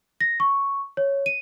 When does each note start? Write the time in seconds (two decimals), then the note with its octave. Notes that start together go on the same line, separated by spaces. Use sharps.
0.21 A#6
0.40 C#6
0.97 C#5
1.26 D#7